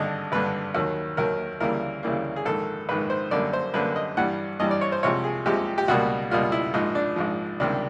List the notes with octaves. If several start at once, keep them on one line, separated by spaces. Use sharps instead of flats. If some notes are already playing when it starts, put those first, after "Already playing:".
Already playing: G#1 G2 D3 D#5
G#1 G2 D3 B4
D#2 D#3 F#3
D#2 D#3 F#3 A#4
D2 C#3 E3 G3 A#3 A#4
D2 C#3 E3 G3 A#3
G#4
A#1 G#2 D#3 A4
A#1 G#2 D#3 B4
C5
F#2 D3 G3 A#3 D5
C5
F#2 D3 G3 A#3 B4
D#5
G2 E3 G3 F#5
G2 E3 G3 D#5
D5
C#5
C5
C2 C3 F3 G#3 C#5
G#4
C2 C3 F3 G#3 G4
G4
C#2 B2 G3 A#3 F#4
C#2 B2 G3 A#3 F4
E4
A#1 G#2 F3 D#4
D4
A#1 G#2 F3
C#2 C3 D#3 G3 D4